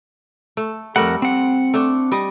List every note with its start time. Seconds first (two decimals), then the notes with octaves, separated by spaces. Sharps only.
0.57 A3
0.96 F2 G3 A3 A#4 F#5
1.22 C4 F#5
1.74 A3 D4
2.12 G3 D#5